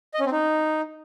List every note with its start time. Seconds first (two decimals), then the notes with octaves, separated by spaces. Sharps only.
0.14 D#5
0.20 C#4
0.26 C4
0.32 D#4